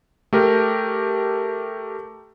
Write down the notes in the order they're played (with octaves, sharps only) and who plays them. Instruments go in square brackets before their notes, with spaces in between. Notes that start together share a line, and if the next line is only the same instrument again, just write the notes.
[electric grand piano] A3 G4 A#4